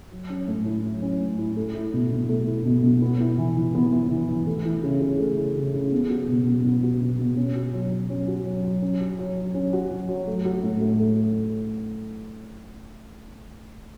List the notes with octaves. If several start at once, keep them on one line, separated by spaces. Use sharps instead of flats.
F#3
C#4
A2
E4
F#3
C#4
A2
E4
A3
E4
B2
B2
A3
E4
B2
B2
B3
E4
E3
E3
B3
E4
E3
E3
A3
E4
C#3
C#3
A3
E4
C#3
C#3
B3
F#4
B2
B2
B3
F#4
B2
B2
C#4
F#4
F#3
F#3
C#4
F#4
F#3
F#3
C#4
F#4
F#3
F#3
C#4
F#4
F#3
F#3
A3
F#4
A2
A2
A3